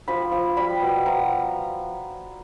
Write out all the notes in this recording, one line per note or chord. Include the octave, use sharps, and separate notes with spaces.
F3 B5
F3
G3 B5
B2
F3 A#5